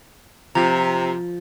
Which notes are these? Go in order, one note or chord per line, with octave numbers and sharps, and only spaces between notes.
C3 F3 A#5